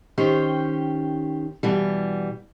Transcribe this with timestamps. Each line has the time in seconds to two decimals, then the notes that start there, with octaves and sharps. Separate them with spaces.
0.18 D#3 C#4 G4 C5
1.63 B2 E3 G3